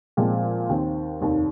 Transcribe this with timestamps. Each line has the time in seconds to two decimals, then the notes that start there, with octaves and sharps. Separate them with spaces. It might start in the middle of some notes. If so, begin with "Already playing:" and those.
0.17 A#2 F3 G#3 C4
0.69 D#2 D#3 C4
1.21 F1 D#2 D#3